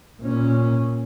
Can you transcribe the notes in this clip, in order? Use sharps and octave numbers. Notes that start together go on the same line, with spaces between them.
A#2 C#4